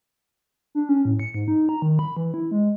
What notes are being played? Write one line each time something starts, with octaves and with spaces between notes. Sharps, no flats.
D4
C#4
A2
C#7
G#2
D#4
A#5
D#3
B5
E3
E4
G#3